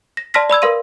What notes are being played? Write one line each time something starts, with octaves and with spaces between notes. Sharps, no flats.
A#6
D5 A5 C6 F6 A#6 B6
D5 B5 E6 G#6
A#4 B4 F5 C6 D#7